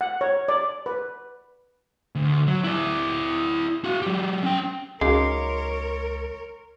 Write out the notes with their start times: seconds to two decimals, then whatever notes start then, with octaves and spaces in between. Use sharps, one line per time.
0.01 F#5
0.21 C#5
0.48 D5
0.86 B4
2.15 D2
2.47 F#3
2.64 E4 D5
3.84 F#4 F5
4.02 F#3 G4
4.43 C#4 G5
5.01 C#2 C#3 F#3 D#4 A#4 C#5 C6 D6